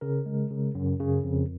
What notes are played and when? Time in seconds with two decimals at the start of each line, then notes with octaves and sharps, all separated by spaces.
0.01 C#3 A#4
0.26 G#3
0.51 C#3
0.75 F#2
1.00 C#3
1.24 F2